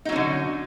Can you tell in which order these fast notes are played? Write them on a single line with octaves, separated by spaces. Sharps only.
D#4 F#3 C#4 D3